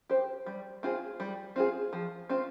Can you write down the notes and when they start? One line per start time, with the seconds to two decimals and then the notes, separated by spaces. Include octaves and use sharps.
0.10 G4 C5
0.46 G3
0.83 C4 F4 G#4
1.20 G3
1.56 C4 F4 G#4
1.93 F3
2.29 C4 F4